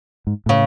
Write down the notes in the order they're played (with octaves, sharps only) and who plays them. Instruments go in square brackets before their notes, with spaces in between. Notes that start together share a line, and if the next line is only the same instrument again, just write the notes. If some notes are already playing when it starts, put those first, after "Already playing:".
[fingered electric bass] G#2
[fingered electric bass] A2 [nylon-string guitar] C#3